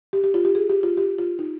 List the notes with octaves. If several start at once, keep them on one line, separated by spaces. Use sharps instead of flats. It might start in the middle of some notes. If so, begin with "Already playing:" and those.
G4
G4
F4
G4
G#4
G4
F4
G4
F4
D#4